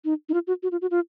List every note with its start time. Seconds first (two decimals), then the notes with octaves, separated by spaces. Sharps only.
0.05 D#4
0.29 D#4
0.34 F4
0.47 F#4
0.63 F#4
0.72 F4
0.82 F#4
0.91 F4